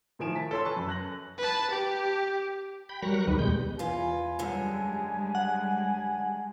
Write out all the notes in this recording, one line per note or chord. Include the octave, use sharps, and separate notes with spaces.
A2 D#3 F3 G#5 D7 E7
A5 B6
A4 C#5 C6 E6
B4 G#5 A5 C#6
F#2
F#6 A#6 F#7
B4 A5
G4
G5 B5
F#3 G3 A#4 A#5 C#6 F#6
D2 D#3 G3 B4
E2 B2 G3 G#3 G6
E2 F4 B4 G#5
F#2 D3 G3 G#3
F#5